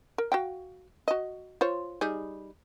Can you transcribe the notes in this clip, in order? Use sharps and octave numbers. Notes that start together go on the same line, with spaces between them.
A#4
F#4 F5 G5
F#4 D#5
F4 C5 C#5
G3 D#4 G#4